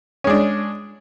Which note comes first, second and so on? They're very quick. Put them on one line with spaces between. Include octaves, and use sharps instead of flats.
C#4 G#3 D4